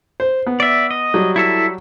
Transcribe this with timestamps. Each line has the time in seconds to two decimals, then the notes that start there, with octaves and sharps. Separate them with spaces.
0.20 C5
0.47 B3
0.60 D5 E5
0.91 D#5
1.14 F#3 G3
1.36 E4 A4 E5